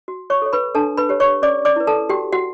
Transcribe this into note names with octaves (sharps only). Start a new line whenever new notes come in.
F#4
C#5 C#6
A4 C#5
B4 B5
D4 A4 A5
B4 B5
G4 C#5
C#5 C#6
C#4 D5 D6
D5 D6
E4 B4
A4 A5
F#4 G4 G5
F#4 F#5